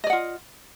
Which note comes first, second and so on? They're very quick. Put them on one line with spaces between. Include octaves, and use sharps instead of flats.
D#5 D5 F#5 F4